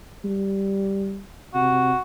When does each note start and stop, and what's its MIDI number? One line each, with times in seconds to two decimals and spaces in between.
0.25 1.22 55
1.54 1.92 48
1.54 2.01 66